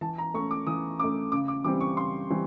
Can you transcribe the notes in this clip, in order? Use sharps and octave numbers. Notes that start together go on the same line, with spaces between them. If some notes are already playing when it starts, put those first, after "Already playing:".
E3 A5
A#5
A3 C#4 C#6
D6
E3 D#6
A3 C#4 D6
C#3 D6
D6
E3 G3 C4 D6
C#6
C#3 C6
E3 G3 C4